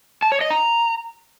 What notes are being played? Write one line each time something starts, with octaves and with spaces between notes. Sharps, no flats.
A5
C#5
D#5
A#5